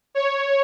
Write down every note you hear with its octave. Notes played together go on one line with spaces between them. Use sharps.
C#5